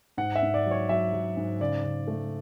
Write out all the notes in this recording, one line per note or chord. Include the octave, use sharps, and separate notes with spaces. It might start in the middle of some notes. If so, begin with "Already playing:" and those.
G#2 F#5
E5
G#2
D5
F#3
C#5
F#3 E5
F#3
G#2
C#3 D5
C#3
A3